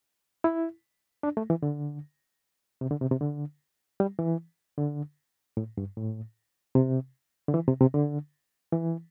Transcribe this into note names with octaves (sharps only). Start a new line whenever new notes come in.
E4
D4
A3
E3
D3
C3
D3
C3
C3
D3
G3
E3
D3
A2
G2
A2
C3
D3
E3
C3
C3
D3
E3